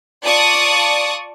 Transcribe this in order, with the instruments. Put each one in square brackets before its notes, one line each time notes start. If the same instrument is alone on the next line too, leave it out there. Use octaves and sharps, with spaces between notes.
[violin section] F4 D5 A5 C#6 D#6